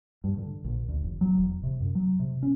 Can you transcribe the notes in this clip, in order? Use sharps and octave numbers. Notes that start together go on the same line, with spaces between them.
G2
D3
A#1
D2
F1
F#3
E1
C3
F#2
F#3
C3
C#4